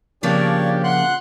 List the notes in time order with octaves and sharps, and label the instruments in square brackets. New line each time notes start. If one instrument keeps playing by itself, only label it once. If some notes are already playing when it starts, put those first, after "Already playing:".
[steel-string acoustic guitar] C#3 F3 A#3 [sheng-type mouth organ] D4 C#5 D5 [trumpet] G4
[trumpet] F#5 [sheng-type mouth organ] C6 F#6